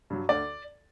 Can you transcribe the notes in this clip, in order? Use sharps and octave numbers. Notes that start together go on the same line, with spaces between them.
G2 F#3
D2 D5